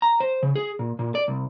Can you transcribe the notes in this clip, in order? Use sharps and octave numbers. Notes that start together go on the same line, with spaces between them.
A#5
C5
C#3
G#4
A#2
A#2
D5
C2